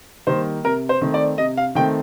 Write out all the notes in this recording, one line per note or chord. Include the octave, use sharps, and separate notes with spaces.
D#3 G3 A#3 C5
C3 A#4
C5
D#3 A3 C4
D5
C3 D#5
F5
D#3 A3 C4 G5